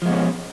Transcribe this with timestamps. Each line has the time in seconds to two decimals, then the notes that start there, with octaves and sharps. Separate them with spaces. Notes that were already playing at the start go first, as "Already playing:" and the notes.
0.02 F3
0.06 G#3
0.09 B2
0.13 C#4